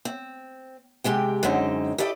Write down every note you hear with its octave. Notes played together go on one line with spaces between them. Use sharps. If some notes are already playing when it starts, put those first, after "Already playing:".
C4
C3 G#3 G4 G5
F#2 D3 G#3 C4 D#4
E4 G4 A4 D5 D#5